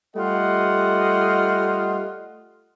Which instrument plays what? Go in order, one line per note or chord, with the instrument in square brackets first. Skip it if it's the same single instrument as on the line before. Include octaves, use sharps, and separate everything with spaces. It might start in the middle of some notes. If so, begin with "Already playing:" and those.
[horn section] G3 A3 F4 D#5 F#5